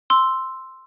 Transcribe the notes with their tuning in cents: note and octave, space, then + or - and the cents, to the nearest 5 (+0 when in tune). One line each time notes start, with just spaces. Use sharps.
C6 +0 E6 +0